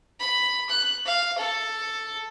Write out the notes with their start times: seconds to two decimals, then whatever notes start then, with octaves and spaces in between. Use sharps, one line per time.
0.19 B5
0.69 F#6
1.06 F5
1.38 A4